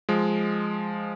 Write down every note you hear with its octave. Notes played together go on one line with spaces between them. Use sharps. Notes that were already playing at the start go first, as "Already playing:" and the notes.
F3 G#3